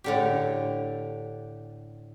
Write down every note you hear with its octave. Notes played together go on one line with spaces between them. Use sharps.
A2 D3 G4